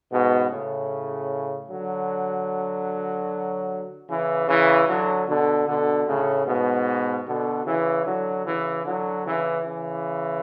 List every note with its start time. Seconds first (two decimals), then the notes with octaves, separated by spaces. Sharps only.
0.10 G#2 B2
0.50 A2 C#3
1.69 D3 F#3
4.08 C#3 E3
4.48 C#3 E3
4.87 D3 F#3
5.28 B2 D3
5.67 B2 D3
6.07 A2 C#3
6.46 G#2 B2
7.26 B2 D3
7.66 C#3 E3
8.05 D3 F#3
8.45 C#3 E3
8.85 D3 F#3
9.25 C#3 E3
9.65 C#3 E3